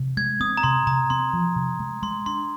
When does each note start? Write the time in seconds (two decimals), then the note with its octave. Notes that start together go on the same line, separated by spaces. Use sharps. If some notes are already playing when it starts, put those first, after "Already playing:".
Already playing: C3
0.17 G#3 G#6
0.40 C4 D#6
0.57 A#5
0.63 C3 C6
0.87 C3 A#5
1.10 C4 C6
1.33 F3
1.56 C3
1.79 G#3
2.02 G#3 C6
2.26 D4 C6